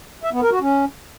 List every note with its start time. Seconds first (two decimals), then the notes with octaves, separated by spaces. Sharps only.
0.23 E5
0.33 B3
0.42 A#4
0.51 F#4
0.61 C#4